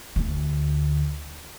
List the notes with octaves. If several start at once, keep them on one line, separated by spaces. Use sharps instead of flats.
D2 A3